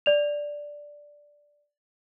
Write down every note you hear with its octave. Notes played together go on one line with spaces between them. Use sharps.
D5 F7